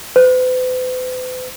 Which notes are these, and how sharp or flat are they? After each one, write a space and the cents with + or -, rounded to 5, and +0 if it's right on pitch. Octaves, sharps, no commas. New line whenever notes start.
B4 +45